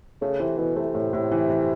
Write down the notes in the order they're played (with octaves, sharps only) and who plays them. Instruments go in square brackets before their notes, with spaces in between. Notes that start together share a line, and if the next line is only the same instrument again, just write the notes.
[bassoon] C#3 [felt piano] A3
[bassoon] C3 [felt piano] E3
[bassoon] B2 [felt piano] E3
[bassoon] C3 [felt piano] A3
[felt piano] A2
A2
E3
E3